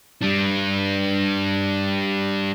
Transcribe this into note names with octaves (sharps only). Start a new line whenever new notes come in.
G3 D4